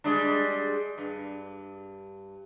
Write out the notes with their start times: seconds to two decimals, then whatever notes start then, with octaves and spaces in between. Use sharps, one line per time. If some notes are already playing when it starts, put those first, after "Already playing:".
0.04 G3 G#3 D4
0.98 G2